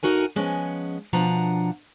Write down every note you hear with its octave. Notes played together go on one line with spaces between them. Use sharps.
D2 A#2 D#4 F#4 A#4 G#5
F3 G#3 B3 C#4
B2 F3 D4 F#5 A#5